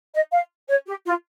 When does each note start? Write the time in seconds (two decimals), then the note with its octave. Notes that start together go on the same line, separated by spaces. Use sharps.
0.14 D#5
0.33 F5
0.68 C#5
0.87 G4
1.05 F4